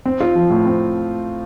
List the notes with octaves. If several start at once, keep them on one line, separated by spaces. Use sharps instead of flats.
C4
F4
F3
A2
C4